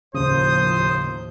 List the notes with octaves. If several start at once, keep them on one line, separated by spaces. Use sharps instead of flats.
D#2 A2 C#3 F3 C5 D#6